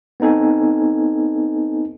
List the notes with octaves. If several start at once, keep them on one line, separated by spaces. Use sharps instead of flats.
B3 C4 D#4 A4 G#5